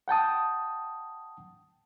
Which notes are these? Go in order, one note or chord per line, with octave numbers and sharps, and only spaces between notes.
F#5 G5 A5 D#6